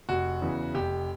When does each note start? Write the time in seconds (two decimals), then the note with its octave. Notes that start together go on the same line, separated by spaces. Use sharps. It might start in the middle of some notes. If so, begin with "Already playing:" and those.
0.09 F1 F#4
0.41 E2 C#3 E3
0.74 F1 G4